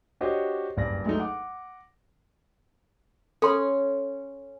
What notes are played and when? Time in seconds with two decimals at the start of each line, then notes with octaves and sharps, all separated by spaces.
0.21 D4 F#4 G4 C5 C#5 D#5
0.77 F#1 G2 D5 A#6
1.05 F#3 G#3 A3 D4 D#4
1.20 F#5 D6
3.42 C#4 A4 C6